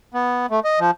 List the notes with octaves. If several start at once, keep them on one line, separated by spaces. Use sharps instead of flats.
B3
A3
D#5
F3